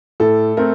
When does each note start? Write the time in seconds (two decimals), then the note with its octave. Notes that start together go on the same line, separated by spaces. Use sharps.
0.20 A2 A4
0.57 A3 C4 A#4